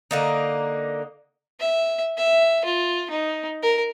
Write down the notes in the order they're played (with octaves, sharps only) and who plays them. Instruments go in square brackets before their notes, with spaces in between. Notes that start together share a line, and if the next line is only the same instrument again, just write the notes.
[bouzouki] D3 A#3 D#4
[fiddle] E5
E5
F4
D#4
A#4